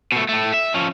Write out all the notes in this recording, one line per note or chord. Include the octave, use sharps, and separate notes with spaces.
B2 A3
A2 A3
E5
F3 C#4